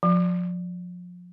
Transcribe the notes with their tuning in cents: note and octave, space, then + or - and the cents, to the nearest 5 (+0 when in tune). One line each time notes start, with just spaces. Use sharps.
F3 +30